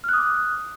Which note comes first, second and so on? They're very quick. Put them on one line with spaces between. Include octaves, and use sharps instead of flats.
F6 F#6 D#6 D6